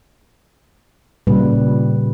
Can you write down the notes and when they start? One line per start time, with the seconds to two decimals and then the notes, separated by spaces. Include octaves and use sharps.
1.27 A#2 C#3 G3 B4